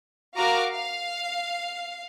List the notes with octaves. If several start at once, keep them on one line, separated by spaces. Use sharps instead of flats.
F#4 A#4 F5 A#5 D6 F6
F5